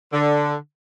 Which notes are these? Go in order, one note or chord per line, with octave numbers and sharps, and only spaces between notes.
D3